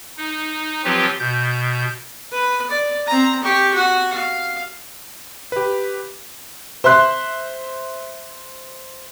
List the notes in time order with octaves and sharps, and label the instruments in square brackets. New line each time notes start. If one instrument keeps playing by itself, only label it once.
[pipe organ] D#4
F3 F#3 C4 F4 G4 B4
B2 G6
[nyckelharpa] B4
D5
C4 A#5
G4 C#6
F#4 F#5
F5
[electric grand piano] G4 B4
[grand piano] C5 E5 C6 F#6